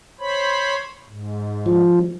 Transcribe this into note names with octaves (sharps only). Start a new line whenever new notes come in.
C5 C#5 B5
G#2
F3